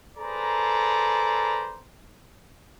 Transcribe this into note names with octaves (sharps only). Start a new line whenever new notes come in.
G#4 A4 B4 C5 D5 A#5